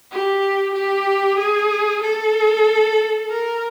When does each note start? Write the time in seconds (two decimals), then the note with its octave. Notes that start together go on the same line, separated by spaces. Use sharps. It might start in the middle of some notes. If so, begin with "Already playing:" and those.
0.11 G4
0.75 G4
1.39 G#4
2.03 A4
3.30 A#4